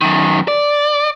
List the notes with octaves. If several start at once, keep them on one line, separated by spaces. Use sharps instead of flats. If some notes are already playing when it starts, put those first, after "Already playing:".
F#2 D#3
D5